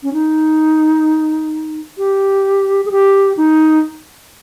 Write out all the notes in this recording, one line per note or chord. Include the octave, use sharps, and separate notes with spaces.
C#4
D#4
G4
G#4
G4
D#4